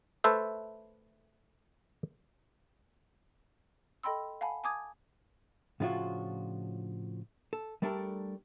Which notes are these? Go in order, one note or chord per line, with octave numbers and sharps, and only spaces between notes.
A3 A4 B4 C5 E5
A4 D#5 G5 B5 C6 E6
F5 F#5 G#5 A5 B5
G#5 A5 D6 D#6 G#6
A2 C#3 F3 D4 F4 F#4
A4
G3 A3 D4 A4 A#4